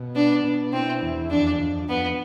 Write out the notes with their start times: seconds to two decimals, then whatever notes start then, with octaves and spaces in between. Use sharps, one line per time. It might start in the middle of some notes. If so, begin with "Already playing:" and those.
Already playing: B2
0.15 B3 D4
0.44 B2
0.73 C4 E4
1.02 E2
1.30 F2 D4
1.60 F2
1.88 F2 B3